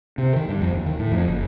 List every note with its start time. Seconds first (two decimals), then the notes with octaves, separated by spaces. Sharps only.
0.18 C3
0.36 D#3
0.49 G2
0.61 F2
0.74 D#2
0.86 D#3
0.99 A2
1.12 F2
1.28 F#1